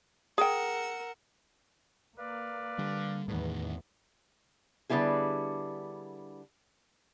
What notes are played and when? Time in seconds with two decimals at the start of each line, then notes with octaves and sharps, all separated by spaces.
0.38 G#4 A#4 F#5 G5 E6
2.18 A#3 B4 D5 F5
2.78 D3 G3
3.28 E2 A2 D#3 B3
4.90 D3 G3 B3 E4 G#4